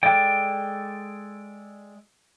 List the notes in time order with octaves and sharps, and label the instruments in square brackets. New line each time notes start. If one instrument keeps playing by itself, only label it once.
[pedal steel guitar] G#3 A4 D5 G5